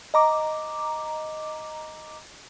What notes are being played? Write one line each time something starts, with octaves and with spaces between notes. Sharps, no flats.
D#5 A#5 D6